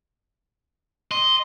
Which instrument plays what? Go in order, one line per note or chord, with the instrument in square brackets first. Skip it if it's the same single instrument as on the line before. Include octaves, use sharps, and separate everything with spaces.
[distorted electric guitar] D#5 [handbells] C6